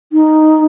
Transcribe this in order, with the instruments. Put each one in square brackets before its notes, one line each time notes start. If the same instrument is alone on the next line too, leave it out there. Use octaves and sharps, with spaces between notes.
[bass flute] D#4